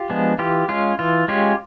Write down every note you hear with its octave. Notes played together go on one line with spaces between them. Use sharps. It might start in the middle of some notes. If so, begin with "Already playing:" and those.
Already playing: F4 G4
F3 G#3 B3 D4
E3 F4 G4
G#3 C#4 F4
E3 F4
G#3 C#4 F4 G4